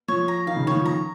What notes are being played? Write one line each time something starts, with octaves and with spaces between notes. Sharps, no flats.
F3 C#5
A#5
D#3 F5
C#3
D#3 C#5
F3
A#5